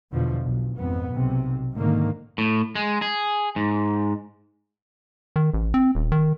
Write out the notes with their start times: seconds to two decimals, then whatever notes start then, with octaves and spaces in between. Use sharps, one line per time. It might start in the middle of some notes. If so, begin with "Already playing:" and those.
0.11 E2 B2 D3 F3
0.43 B1
0.77 G#1 F2 B3
1.10 B1 C3
1.74 G#2 D3 D#3 A#3
2.38 A2
2.75 G#3
3.02 G#4
3.56 G#2
5.36 D#3
5.54 A1
5.74 C4
5.95 D#1
6.12 D#3